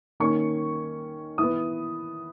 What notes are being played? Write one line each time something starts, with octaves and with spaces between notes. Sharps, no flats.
D#3 A#3 C#4 C#6
E3 B3 D#6